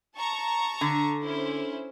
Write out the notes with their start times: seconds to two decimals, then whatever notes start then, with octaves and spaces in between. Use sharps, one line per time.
0.17 A5 A#5 C#6
0.81 D3
1.22 C#4 E4 C5